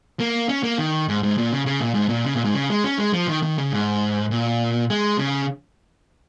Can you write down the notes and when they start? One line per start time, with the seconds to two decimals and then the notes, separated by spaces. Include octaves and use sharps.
0.20 A#3
0.49 C#4
0.63 A#3
0.78 D#3
1.08 G#2
1.23 G#2
1.38 A#2
1.52 C#3
1.66 C#3
1.80 A#2
1.94 G#2
2.09 A#2
2.25 C#3
2.35 A#2
2.45 G#2
2.54 C#3
2.70 G#3
2.84 C#4
2.99 G#3
3.13 F3
3.28 D#3
3.43 D#3
3.58 C#3
3.72 G#2
4.31 A#2
4.90 G#3
5.18 C#3